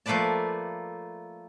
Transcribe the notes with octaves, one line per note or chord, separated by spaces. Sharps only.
F3 A3 A#3 B4 D5 A5